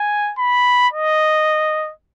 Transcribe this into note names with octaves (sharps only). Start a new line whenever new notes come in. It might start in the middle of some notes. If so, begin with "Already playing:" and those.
Already playing: G#5
B5
D#5